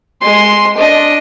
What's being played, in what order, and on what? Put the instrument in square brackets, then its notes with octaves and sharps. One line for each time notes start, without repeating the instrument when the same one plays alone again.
[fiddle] G#3 C6
D4 D#5